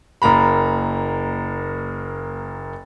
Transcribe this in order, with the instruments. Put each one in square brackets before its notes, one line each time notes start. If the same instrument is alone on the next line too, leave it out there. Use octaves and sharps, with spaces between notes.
[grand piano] F#1 A#3 A#5 B5